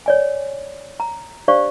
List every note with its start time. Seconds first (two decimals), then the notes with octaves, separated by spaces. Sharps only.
0.06 C#5 D5 G#5
1.00 A#5
1.48 D4 G4 C5 D5 F5 C#6